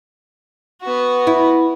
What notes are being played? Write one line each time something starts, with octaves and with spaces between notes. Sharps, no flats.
B3 F#4
E4